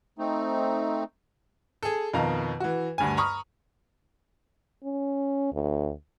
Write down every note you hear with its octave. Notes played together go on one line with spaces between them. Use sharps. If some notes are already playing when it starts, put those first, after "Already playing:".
A3 C4 D#4
G#4 A4
F2 B2 D#3 F5 A#5
E3 F#4
D2 G2 G#5
A#5 B5 C#6 D#6 F6
C#4
D2